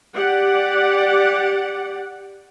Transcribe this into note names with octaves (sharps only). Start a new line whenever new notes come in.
G4 D5 F#5